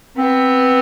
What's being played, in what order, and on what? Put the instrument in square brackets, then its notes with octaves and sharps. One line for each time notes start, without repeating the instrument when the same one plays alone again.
[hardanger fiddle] B3 [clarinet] C4